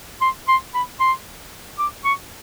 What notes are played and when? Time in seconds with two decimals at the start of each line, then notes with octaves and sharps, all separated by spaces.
0.21 C6
0.48 C6
0.74 B5
1.00 C6
1.78 D6
2.05 C#6